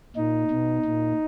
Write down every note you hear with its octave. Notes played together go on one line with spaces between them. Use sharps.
A#2 D#4
B2
A#2